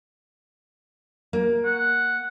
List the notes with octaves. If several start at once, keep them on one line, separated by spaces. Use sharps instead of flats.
A#3
F#5